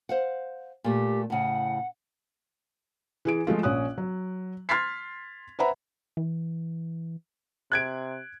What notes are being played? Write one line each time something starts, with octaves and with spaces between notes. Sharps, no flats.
C5 F5 F#5
A#2 A3 G4
A2 C#3 F#5
E3 G#4 D7
F3 G#3 A3 F4
A#1 C#4 C#5 D#6 F#6
F#3
C6 F6 G#6 A6 B6 C7
B4 C5 E5 F#5 A#5 B5
E3
C3 F#6 G#6 D7